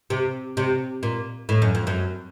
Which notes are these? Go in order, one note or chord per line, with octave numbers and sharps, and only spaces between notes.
C3
C3
A#2
A2
F#2
F2
F#2